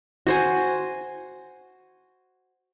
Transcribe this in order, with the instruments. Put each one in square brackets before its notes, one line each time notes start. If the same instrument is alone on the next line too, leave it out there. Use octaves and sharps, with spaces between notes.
[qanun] F#4 C5 G#5